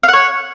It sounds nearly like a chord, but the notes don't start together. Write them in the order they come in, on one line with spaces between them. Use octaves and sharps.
F5 F#5 C#5